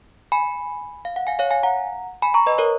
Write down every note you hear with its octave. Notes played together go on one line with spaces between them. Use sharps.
G#5 B5
F5
F#5
F5 G#5
C#5 F5
F5 G#5
F#5 A#5
G#5 B5
A#5 C#6
B4 D#5
A#4 C#5